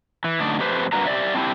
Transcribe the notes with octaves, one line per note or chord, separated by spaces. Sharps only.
E3
F#2 D3 A3 D#4 D5
F2 A3 G4 B4 C5
G2 A#3 D4 F#4 B4 A#5
G4 D5 E5
C4 D4 E4 G4